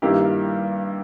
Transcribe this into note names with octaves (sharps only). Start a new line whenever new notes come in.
G2 D#3 A#3 E4 G4